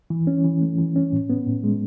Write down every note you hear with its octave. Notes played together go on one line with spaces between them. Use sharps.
E3
C#4
E3
A3
E3
C#4
A2
B3
A2
G#3